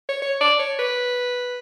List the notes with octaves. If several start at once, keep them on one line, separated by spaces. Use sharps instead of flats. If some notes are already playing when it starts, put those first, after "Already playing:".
C#5
C#5
D5
C#5
B4